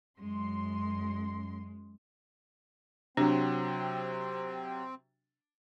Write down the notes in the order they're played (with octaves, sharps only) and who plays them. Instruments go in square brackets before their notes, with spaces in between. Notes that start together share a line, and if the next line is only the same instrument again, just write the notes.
[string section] F#2 C6 [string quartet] G#3
[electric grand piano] C3 F#3 [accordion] C4 [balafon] D4